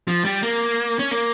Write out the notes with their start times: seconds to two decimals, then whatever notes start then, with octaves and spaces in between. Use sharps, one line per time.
0.08 F3
0.25 G3
0.42 A#3
0.99 C#4
1.11 A#3